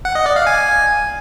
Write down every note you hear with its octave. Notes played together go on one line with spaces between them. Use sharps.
F#5
D#5
D5
F5
G#5